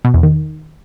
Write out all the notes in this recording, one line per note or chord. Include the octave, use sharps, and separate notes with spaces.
B2
E2
D#3